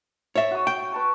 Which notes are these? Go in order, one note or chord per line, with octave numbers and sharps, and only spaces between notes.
C#5 E5
F#4 D#6
G5
B4 A5 C#6